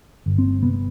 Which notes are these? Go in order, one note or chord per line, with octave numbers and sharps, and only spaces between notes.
G1
C4
C3 B3